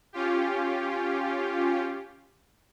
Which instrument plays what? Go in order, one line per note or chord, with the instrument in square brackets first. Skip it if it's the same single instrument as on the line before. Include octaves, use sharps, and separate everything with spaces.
[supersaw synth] C#4 F4 G4